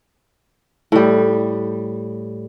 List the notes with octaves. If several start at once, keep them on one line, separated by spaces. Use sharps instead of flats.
A2 G3